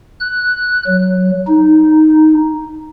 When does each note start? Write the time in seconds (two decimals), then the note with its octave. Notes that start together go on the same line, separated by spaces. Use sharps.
0.20 F#6
0.87 F#3
1.47 D#4